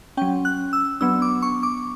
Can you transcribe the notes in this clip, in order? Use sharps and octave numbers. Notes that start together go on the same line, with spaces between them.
F#3 C#4 G5
F#6
E6
F#3 B3 D4 E6
D6
C#6
D6